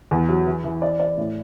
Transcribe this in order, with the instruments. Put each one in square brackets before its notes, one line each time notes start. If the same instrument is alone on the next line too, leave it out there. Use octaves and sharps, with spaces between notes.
[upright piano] E2
F#3
E3
E3
D5
D5
A2